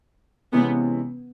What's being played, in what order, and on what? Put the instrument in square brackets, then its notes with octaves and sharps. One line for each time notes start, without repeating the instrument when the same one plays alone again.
[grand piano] C3 E3 G#3 C#4 [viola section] B3